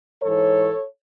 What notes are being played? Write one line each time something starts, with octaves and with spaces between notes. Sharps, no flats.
G#2 E3 A4 C#5